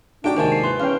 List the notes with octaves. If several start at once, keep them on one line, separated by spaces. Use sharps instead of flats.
A2 D4 D#4 F#4 G4 G5 D6 D7
D#2 G#2 C3 D#3 C5 G#5 A5
C7
E4 B4 C6
E2 C#4 F5 G5